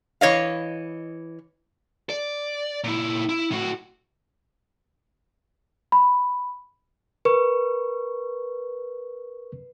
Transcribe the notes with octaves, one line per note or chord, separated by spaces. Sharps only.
E3 C#5 D#5 F5
D5
A#2 E4
E4
A2 F#4
B5
A#4 B4 C#6